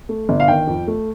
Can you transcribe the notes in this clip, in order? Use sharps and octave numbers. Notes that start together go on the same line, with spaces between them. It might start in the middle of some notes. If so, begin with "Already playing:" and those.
A3
G1
F5
D#3 G5
F2
A3